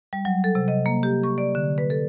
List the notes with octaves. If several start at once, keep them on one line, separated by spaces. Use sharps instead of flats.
G3
F#3
A4
C3
D#5
A#3
G4
C#6
D5
D3
B4
A4